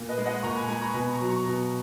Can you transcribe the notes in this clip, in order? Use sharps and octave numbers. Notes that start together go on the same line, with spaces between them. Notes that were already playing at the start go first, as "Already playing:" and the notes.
Already playing: A#2
B4 D#5
G#3
D#5 F#5
A#2 A#5 C#6
G#5 B5
G#3 G#5 B5
A#5 C#6
B2 G#5 B5
A#5 C#6
F#3
A#5 C#6
B2